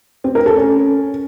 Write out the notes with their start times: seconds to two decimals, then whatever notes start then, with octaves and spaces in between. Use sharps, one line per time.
0.24 C4
0.35 A#4
0.46 A4
0.57 C#4